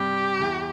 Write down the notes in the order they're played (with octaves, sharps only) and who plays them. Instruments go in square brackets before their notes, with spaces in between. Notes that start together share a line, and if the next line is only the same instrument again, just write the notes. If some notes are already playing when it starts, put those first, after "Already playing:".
Already playing: [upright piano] G2 C3 G3 C4 [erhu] G4
[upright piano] E2 E3